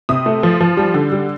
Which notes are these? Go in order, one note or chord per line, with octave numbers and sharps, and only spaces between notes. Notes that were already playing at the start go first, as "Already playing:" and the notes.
C3 D#6
A3
F3
F3
G3
D3
G3